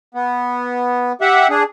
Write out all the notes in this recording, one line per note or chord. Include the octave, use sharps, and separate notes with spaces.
B3
G4 E5 F#5
D4 G#4